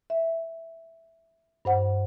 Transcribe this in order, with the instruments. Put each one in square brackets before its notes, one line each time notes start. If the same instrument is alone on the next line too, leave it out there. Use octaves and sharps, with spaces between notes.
[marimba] E5
G2 C5 F#5